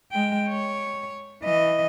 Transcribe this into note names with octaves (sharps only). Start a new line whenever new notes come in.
G#3 G5
C#5
E3 D#5